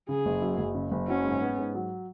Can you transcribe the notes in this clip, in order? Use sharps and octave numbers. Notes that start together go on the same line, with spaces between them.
C#3 G#4
F#1
F#2
F#1
C#3
F#1
F#3 C#4
G#2
B3
G#2
F#3